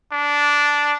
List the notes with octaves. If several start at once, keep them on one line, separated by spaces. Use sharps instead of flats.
D4